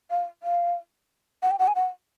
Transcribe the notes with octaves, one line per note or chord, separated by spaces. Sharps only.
F5
F5
F#5
G5
F#5
G#5
F#5